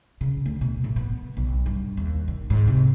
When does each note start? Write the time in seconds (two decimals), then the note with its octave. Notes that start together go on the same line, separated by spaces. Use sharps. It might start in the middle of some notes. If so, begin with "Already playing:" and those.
0.21 C#3
0.46 D2
0.61 B2
0.84 A1
0.96 B3
1.37 B1
1.66 G2
1.97 D#2
2.28 D#3
2.50 G#2
2.68 C3